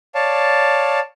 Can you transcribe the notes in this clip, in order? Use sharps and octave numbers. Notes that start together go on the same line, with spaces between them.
C#5 D5 F5 A5